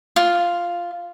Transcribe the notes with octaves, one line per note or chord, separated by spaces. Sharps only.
F4